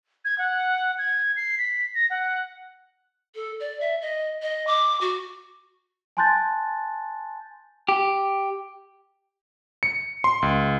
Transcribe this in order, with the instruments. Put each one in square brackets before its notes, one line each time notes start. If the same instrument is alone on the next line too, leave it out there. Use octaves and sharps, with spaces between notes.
[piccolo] G#6
F#5
G#6
C7
B6
A#6
F#5
[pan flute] A4
D5
E5
D#5
D#5
D6
F#4
[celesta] G#5 A5 C6 F#6 G6 A6
[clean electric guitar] G4
[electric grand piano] C#7
C6
C#2